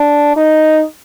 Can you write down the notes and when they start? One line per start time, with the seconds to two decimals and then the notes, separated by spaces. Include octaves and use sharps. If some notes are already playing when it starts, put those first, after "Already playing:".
Already playing: D4
0.37 D#4